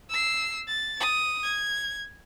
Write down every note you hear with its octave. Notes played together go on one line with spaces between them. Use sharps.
E6 C7
A6
D#6
G#6